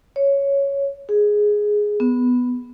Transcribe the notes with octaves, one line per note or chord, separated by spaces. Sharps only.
C#5
G#4
B3